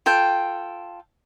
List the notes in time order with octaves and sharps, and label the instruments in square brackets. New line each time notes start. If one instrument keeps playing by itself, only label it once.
[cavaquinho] F4 A4 G5